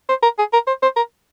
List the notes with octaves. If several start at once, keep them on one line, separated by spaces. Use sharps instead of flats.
C5
A#4
G#4
A#4
C5
C5
A#4